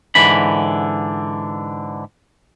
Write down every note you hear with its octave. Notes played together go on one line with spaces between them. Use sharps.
G#2 D3 E3 B5